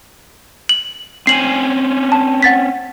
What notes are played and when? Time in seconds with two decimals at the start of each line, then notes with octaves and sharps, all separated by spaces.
0.69 F#7
1.27 C4 C#4 G#5 C7 F#7
2.12 A5
2.43 F#5 A6 B6